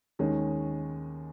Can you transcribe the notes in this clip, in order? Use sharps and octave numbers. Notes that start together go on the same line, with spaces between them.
D#2 D#3 G#3 C#4